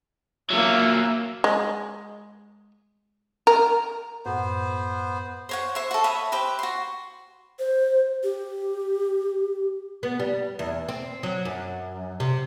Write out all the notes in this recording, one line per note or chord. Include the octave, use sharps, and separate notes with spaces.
A#2 F#3 A#3 E5
G#3
A#4
F#2 A2 B3 C5 F#5
C5 C#5 F#5
C5 E5 C#6
F#4 A4
C#5 E5 B5 D#6
G4 B4 C5 E5
F#4 C6
C5
G4
B3
G3
E2
C4
F#3
F#2
C3